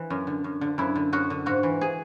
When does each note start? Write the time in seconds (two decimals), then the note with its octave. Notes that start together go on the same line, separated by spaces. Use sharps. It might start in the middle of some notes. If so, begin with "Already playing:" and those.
Already playing: E3
0.10 F#2
0.27 D3
0.44 F#2
0.61 D3
0.78 F#2 E4
0.95 D3
1.13 F#2 F#4
1.30 D3
1.46 G#2 F#4
1.63 E3
1.81 G#4